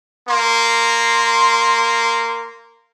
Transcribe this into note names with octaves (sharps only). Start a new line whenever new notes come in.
A#3 C6